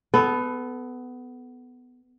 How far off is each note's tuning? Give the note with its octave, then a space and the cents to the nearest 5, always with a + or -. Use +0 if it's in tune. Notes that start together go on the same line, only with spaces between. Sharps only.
B3 +15 A4 -15